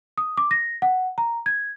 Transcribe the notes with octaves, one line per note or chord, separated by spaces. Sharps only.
D#6
D6
A#6
F#5
A#5
G#6